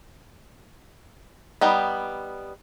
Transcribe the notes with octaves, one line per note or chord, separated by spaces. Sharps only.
G3 B3 D#4 G5